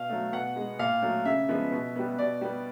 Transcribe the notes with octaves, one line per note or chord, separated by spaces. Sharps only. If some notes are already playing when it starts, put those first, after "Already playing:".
Already playing: B2 F5
F#3 A3
B2 F#5
G#3 B3
A#2 F5
F#3 A3
C#3 E5
F3 G#3 B3
B2
G3 B3
B2 D5
G3 B3